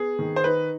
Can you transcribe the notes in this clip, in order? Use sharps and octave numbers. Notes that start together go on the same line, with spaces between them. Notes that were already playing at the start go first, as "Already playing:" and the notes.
Already playing: B3 G#4
D#3
C5
D#4 B4